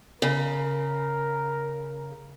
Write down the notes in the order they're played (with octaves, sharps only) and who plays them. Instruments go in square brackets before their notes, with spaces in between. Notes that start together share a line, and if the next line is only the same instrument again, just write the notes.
[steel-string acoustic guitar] C#3 [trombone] A#4